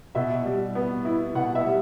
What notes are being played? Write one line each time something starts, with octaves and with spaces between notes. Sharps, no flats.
B2 E5
G3
B3
E4
B2 F#5
E5
G3